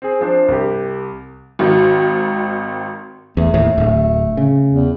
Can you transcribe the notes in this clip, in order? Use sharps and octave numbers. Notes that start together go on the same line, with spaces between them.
C4 G#4
F3 D4 C5
C2 G4
G#1 D#3 F#4
E2 A3
D#2 A2
D1
C#3
E2